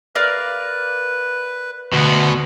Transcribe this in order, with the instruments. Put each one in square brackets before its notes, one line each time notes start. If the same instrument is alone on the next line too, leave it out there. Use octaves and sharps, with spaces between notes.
[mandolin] A#4 D5 F5 [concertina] B4
[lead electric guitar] D2 [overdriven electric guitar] B2 B3